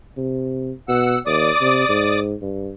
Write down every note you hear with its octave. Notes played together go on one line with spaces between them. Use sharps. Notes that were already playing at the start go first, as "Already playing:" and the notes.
C3
B2 F#5 E6
D#2 D5 D6 D#6
C3
G#2
G2